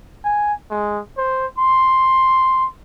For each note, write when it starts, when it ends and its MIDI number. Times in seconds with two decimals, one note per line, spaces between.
0.24 0.53 80
0.70 1.00 56
1.17 1.46 72
1.58 2.66 84